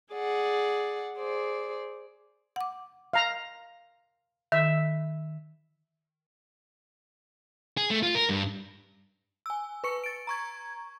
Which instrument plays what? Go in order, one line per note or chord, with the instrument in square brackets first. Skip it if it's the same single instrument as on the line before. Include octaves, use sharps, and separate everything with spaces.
[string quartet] G#4 D5 F#5
G#4 C5 D5
[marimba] F#5 D6
[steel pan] F5 A#5
[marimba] D#3 [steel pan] E5
[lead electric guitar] G#4
A3
F4
A#4
G2
[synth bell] G#5 E6
B4 C#6 C#7
A6 D7
A#5 C#6 G#6